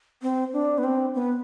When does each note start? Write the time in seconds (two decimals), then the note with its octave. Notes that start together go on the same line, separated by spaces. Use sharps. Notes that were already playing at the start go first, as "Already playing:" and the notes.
0.22 C4
0.53 D4
0.78 B3
0.84 C4
1.14 B3